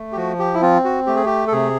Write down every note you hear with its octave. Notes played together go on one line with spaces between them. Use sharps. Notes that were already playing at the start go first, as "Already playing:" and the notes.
Already playing: A3
G4
F3 F#4
G4
E4
C4 F4
F#4
A3 G4
G#4
G4
A4
C3 G#4